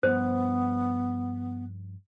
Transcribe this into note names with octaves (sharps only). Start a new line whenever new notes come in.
G2 F3 B3 C5